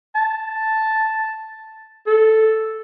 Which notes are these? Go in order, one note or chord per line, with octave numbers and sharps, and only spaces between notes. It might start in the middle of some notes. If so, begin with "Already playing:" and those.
A5
A4